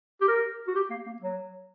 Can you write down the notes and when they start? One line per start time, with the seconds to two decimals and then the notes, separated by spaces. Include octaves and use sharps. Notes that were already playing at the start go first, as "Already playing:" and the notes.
0.21 G4
0.28 A#4
0.68 F#4
0.75 G4
0.90 A#3
1.06 A#3
1.22 F#3